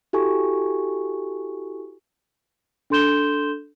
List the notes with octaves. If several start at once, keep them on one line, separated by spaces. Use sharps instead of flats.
E4 F#4 G4 A4 G#5 C#6
D4 A4 C6 G6 E7 G7